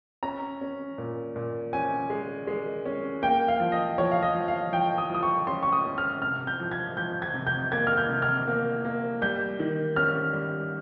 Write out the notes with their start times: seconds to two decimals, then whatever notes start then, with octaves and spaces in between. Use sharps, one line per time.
0.23 C#4 A#5
0.61 C#4
0.98 A#2
1.36 A#2
1.73 C#4 G#5
2.10 G#3
2.47 G#3
2.86 C#4
3.22 A#3 G5
3.48 F5
3.60 F3
3.72 D#5
3.98 F3 C#5
4.11 F5
4.22 D#5
4.34 F3
4.48 F5
4.72 F3 G5
4.98 D#6
5.10 F3 D#6
5.23 C#6
5.47 C#4 C6
5.63 C#6
5.72 D#6
5.85 C#4
5.98 F6
6.22 C3 F6
6.47 G6
6.60 F3
6.71 G#6
6.97 F3 G6
7.22 G#6
7.34 C3
7.47 G6
7.72 A#3 G#6
7.87 F6
7.97 G6
8.09 C3
8.22 F6
8.47 A#3
8.85 A#3
9.22 G3 G6
9.59 D#3
9.96 C#4 F6
10.33 G3